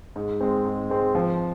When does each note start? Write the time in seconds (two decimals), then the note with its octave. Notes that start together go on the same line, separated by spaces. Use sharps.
0.16 G#2
0.40 G#3 C4
0.65 G#2
0.90 G#3 C4
1.15 F3